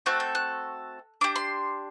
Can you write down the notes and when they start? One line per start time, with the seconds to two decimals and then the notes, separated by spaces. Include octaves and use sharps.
0.06 A3 C4 F#4 A4 F#6
0.20 G6
0.35 F#6
1.21 D4 G4 D6
1.36 C6